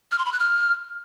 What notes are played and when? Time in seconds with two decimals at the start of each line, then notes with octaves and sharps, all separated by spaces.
0.12 F6
0.18 C6
0.25 B5
0.32 F#6
0.39 F6